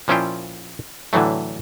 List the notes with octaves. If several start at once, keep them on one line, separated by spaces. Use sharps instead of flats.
A#2 F3 C#4 E4 F4 G5
A2 D3 E3 F#3 A3